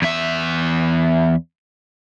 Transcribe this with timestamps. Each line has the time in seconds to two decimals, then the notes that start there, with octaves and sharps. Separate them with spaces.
0.02 E2 E5